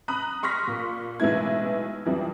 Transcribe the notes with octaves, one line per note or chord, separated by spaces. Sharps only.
A#5 B5 D#6 F#6
C6 C#6 F6 A#6 B6
A#2
B1 A2 E3 G#3 E4 G#6
F2 E3 G3